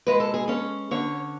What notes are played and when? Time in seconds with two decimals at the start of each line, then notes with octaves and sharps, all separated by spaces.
0.07 G#3 B4
0.20 A4
0.34 G#4
0.48 C#4 A4
0.91 D3 C#5